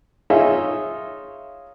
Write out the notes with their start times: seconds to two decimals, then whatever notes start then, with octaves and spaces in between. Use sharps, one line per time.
0.30 D#4 F4 G#4 C#5 E5